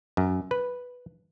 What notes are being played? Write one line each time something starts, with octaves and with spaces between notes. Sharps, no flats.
F#2
B4